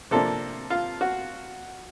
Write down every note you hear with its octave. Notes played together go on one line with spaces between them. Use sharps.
C3 F3 A#3 D4 A4
F4
F#4